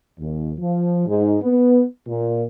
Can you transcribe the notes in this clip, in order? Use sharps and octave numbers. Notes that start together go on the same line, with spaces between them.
D#2
F3
G#2
B3
A#2